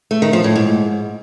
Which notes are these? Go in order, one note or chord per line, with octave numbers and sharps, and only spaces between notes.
A3
D#3
F3
A2
G#2